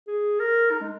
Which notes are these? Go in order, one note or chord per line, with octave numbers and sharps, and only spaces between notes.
G#4
A#4
D#4
G#3